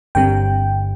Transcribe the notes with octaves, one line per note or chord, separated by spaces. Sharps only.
G1 G2 D3 G3 C4 G5